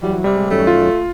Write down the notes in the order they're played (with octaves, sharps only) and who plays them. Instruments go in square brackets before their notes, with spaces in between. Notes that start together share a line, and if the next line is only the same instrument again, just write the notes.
[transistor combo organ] E3 F#3 [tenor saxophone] G3
[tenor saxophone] C3 [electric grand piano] G3
[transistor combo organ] G#3
[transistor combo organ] F#2 D#3 C#4 [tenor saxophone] A3
[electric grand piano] F4